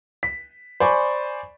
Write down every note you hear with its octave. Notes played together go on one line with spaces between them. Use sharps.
B6
C5 D5 G#5 B5 C#6